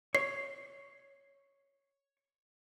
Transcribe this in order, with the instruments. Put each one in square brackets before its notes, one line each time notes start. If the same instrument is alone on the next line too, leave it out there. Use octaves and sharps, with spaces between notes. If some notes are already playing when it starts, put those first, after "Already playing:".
[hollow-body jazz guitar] C#5 [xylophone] C7